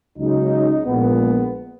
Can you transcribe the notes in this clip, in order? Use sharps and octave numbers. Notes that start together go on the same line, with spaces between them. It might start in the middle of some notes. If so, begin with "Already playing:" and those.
C#2 C#3 F#3 D#4
A#1 A#2 G#3 B3